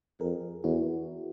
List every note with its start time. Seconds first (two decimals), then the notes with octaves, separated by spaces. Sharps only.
0.21 F2 G#4 A#4
0.64 E2 E4 F#4